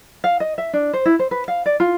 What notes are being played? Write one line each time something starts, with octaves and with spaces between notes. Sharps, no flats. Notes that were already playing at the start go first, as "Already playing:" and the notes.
F5
D#5
E5
D4
C5
E4
C5
B4
F5
D5
F4